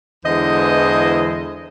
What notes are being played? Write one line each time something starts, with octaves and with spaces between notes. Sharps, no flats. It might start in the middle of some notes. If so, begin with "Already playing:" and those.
E2 D3 E3 G#3 C5 D#5